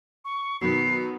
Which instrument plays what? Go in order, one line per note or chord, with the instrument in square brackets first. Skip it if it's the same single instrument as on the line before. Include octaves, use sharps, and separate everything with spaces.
[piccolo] C#6
[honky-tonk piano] B2 D#3 F#3 [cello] B3 [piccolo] C7